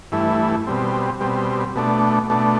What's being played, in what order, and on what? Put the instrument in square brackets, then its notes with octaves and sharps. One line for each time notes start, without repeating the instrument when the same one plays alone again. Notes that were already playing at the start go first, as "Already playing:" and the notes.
[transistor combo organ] G2 E3 A3 E4
B2 G3 C4
B2 G3 C4
B2 A3 D4
B2 A3 D4